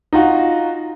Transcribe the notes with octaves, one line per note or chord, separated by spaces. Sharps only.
D#4 F4 F#4